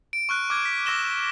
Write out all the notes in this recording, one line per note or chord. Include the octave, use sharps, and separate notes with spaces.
D7
C#6 F6 F#6
D6 F6 G#6
B6
D6 E6 A#6 E7 G7